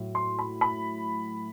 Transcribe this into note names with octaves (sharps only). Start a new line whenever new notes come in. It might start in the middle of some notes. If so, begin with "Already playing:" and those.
Already playing: A2 F#3 A3
C6
B5
B5